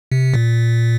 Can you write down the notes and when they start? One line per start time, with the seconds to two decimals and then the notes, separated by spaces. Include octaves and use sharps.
0.12 C3
0.34 A#2